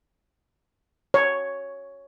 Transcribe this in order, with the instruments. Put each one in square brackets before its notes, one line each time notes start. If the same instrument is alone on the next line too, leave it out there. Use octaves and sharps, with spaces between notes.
[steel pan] C#5